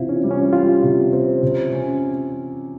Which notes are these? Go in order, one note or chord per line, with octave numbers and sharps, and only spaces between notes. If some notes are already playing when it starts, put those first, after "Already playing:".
Already playing: C3 C4 E4 F4
C#4
G3
C#4
F4 G4
C3
C4
C3
C#4